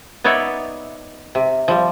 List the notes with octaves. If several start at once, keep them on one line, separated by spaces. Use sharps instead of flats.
B3 D#4 C#5 D5 E5
C3
F3 G3